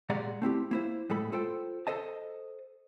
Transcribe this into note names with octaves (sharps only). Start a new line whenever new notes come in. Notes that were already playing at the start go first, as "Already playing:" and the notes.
A#2 G#3 G4 D5 F#5 A#5
A3 C4 E4 G4
A#3 E4 C5
A2 G#3 A4 B5
F4 A4 C5 G5
A4 C5 D#5 A5